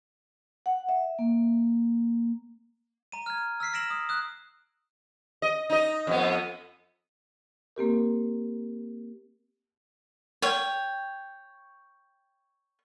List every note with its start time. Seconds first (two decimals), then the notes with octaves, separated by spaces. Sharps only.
0.66 F#5
0.89 E5
1.19 A#3
3.12 A#5 D#7
3.26 F6 G#6
3.60 E6 F6 B6 C7
3.73 E6 A#6 D7 E7 F#7
3.90 D#6
4.09 D#6 F#6
5.42 D#5
5.70 D#4 D#5
6.07 F2 B3
7.76 A#3 C4 G4 A#4
10.42 C#5 G5